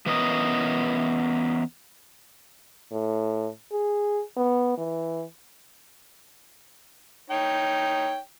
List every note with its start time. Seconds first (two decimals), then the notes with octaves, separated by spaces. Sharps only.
0.06 E3 B3 C#4 A#4 D#5
2.92 A2
3.72 G#4
4.37 B3
4.78 E3
7.30 D#4 C#5 G5